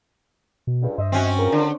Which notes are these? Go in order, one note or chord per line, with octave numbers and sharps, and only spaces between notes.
B2
C#2 G2
G2 C5 D#5 E5
C4 C#4 F#4
C#2 A#4
D3